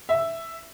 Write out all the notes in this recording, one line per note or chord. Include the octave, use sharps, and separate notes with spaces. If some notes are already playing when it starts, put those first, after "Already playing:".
E5